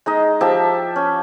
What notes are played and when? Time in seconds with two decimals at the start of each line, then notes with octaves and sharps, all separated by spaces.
0.06 G#3 D#4 D#5
0.41 F3 G4 E5 A5
0.96 C#4